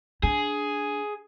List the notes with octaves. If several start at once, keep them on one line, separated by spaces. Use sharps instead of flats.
D4 G#4